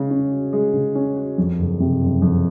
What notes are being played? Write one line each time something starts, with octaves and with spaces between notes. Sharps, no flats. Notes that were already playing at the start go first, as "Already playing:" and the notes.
Already playing: C#3 G#3
C#4
F#4
G#3
C#3
C#4
F#4
F2
F#1
C3
F#1
F2